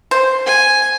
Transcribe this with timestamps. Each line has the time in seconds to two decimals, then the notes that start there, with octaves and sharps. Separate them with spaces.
0.11 C5
0.46 G#5